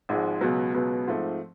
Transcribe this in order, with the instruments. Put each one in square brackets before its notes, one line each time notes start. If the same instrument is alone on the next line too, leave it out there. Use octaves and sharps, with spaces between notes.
[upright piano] G#1 G#2 F3 G#3
C#2 B2 F#3 B3
C#2 B2 F#3 B3
G#2 F3 A3 C4